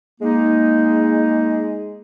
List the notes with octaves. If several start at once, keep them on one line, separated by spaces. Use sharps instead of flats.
G#3 A#3 D#4